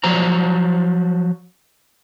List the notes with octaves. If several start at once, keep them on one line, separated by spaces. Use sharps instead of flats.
F3 F#3 C5 A#5